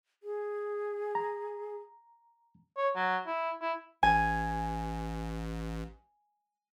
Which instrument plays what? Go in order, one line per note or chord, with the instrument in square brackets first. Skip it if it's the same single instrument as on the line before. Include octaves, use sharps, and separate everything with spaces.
[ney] G#4
[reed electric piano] A#5
[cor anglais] C#5
F#3
E4
E4
[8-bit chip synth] A1 [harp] G#5